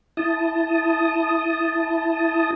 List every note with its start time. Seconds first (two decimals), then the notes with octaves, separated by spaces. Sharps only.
0.17 E4 A5 D#6